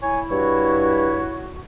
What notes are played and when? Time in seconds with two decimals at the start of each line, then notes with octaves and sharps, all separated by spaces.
0.03 E4 C#5 G#5
0.31 G2 F#4 C#5